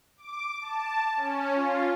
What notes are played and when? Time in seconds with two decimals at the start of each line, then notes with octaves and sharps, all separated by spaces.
0.17 D6
0.60 A5
1.17 C#4
1.54 F4